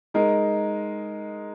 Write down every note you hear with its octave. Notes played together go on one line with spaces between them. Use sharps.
G#3 D#4 A#4